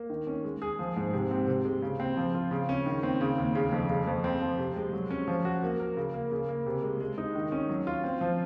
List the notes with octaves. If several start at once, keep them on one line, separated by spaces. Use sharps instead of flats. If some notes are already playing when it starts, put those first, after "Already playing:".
Already playing: A#3
D#3
C#4
G#3
G#4
F3
G#2
C3
C4
C3
G#3
C#3
C4
F3
F4
C#3
C#4
D#3
C4
C#3
D#2
C#3
F2
C#3
F2
C4
F3
C3
G#3
F#3
C#4
F3
F#4
A#3
A#4
C#3
A#3
C#3
A#3
C3
G#3
G#3
D#4
D#3
C#4
F#3
F4
C4
F3